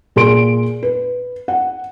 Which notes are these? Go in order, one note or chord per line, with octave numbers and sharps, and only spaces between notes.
A#2 G#4 C6 D7
B4
F#5